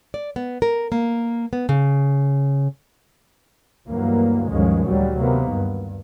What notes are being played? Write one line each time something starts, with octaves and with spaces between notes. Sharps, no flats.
D5
B3
A#4
A#3
B3
C#3
D2 G2 E3 F#3 A#3
D2 G2 D#3 F3 G#3 C#4
D2 A#2 F#3 G3
C3 D#3 A#3 B3
G2